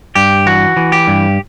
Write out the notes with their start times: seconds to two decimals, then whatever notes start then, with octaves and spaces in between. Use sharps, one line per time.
0.15 G2 G4
0.46 E3 F#4
0.77 E3
0.92 G4
1.07 G2